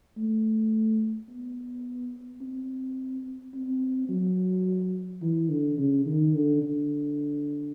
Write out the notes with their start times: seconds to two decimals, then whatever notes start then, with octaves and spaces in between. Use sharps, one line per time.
0.17 A3
1.29 B3
2.41 C4
3.54 C4
4.09 F#3
5.22 E3
5.50 D3
5.78 C#3
6.06 D#3
6.34 D3
6.62 D3